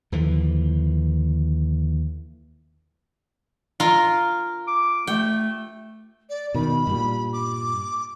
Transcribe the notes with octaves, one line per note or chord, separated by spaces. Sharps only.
D#2 D3 E3 F3
F4 A#4
D6
A3 G5
D5
B2 D#3 B5
G2 A#2 G3
D6